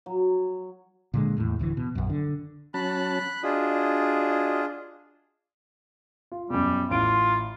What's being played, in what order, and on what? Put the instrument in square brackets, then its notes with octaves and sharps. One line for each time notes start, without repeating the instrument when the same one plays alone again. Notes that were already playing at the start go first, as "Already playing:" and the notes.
[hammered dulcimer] F#3
[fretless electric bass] A#2 D3 G#3
E2 A2
D1 D2 C3 E3
B2
A#1 F#2
D3
[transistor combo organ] F#3 C#4 A5 [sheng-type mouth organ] B5 F#6
[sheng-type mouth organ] D4 F4 G#4 [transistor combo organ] F#4 D#5
[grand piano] F4
[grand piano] F#2 B2 [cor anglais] G3
[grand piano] A1 D7 [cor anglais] F4